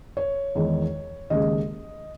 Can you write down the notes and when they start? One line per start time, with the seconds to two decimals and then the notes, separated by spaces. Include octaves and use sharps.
0.17 C#5
0.55 E2 D#3 G#3
1.30 D#2 C#3 G#3 D#5